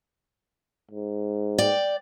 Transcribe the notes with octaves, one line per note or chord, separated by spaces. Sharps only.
G#2
D5 G5